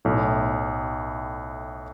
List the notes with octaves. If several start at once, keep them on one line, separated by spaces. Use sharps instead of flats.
B1 A2 A3